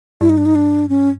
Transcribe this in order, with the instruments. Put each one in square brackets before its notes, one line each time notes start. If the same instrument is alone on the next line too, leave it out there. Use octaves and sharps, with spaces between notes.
[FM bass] G2 [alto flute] E4
[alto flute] D#4
D4
D#4
D4
C#4